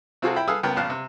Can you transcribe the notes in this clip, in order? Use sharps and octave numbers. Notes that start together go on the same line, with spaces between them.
C3 C4 F4 F#4 G#4 A4
E4 G5 B5
G#4 A4 B4 F5 D#6 E6
C#2 B3 A#4 G5
A#1 C#3 F5 A5 F#6
C3